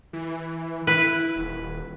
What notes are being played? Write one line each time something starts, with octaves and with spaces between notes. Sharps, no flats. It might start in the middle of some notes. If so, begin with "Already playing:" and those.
E3
E4 B4
D#1